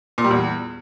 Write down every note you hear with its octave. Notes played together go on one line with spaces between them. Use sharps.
A#2
G3
E2